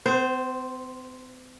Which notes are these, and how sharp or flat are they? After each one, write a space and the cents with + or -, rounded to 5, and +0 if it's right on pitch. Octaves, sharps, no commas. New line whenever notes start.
C4 -45 C5 -5